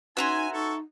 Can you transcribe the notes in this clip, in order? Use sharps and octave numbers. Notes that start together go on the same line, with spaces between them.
C#4 D#4 F#4 B4 E5 G#5 A#5 C6
D#4 A4 C#6